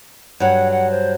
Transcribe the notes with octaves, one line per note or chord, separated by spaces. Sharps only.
G2 F#3 F#5
F#5
C5